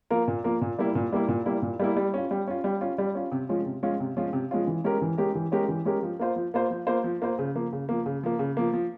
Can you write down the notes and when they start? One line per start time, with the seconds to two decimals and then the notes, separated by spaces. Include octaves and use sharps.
0.10 F3 A#3 F4 A#4
0.28 A#2
0.44 F3 A#3 F4 A#4
0.62 A#2
0.79 G3 A#3 E4
0.95 A#2
1.12 G3 A#3 E4
1.28 A#2
1.46 G3 A#3 E4
1.62 A#2
1.80 G3 A#3 E4
1.97 G3
2.14 C#4 F4
2.31 G3
2.48 C#4 F4
2.64 G3
2.81 C#4 F4
2.98 G3
3.15 C#4 F4
3.32 C3
3.49 F3 G#3 C#4 F4
3.66 C3
3.83 F3 G#3 C#4 F4
4.00 C3
4.17 F3 G#3 C#4 F4
4.33 C3
4.51 F3 G#3 C#4 F4
4.67 E3
4.84 G#3 C#4 G4 A#4
5.02 E3
5.18 G#3 C#4 G4 A#4
5.35 E3
5.52 G#3 C#4 G4 A#4
5.68 E3
5.85 G#3 C#4 G4 A#4
6.03 F3
6.20 A#3 F4 C5
6.36 F3
6.54 A#3 F4 C5
6.71 F3
6.87 A#3 F4 C5
7.04 F3
7.22 A#3 F4 C5
7.39 C#3
7.55 F3 A#3
7.73 C#3
7.89 F3 A#3
8.06 C#3
8.23 F3 A#3
8.39 C#3
8.57 F3 A#3
8.73 F3